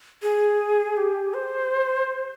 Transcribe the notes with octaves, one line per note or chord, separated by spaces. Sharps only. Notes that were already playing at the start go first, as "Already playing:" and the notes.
G#4
G4
C5